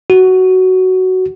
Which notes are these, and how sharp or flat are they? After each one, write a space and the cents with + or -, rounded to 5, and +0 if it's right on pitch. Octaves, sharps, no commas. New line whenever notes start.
F#4 +10